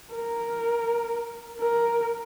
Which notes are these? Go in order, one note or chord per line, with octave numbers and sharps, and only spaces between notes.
A#4
A#4